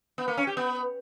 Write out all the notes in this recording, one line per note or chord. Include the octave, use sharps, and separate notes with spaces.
B3
A#3
C#4
G4
B3